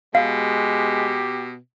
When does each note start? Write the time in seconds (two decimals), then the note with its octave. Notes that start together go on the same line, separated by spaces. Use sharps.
0.15 B2 G#3 G4 F5